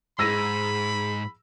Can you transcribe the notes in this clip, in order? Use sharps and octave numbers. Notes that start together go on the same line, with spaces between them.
G#2 G#4 B5 E6 A#6 D#7